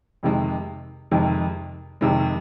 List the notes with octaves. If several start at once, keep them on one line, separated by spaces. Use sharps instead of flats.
F2 C3 D#3 G#3
F2 C3 D#3 G#3
F2 C3 D#3 G#3